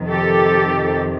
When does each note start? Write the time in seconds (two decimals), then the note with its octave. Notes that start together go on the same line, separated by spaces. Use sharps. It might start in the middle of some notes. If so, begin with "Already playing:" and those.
Already playing: F2 C3 D#3
0.09 G4 A4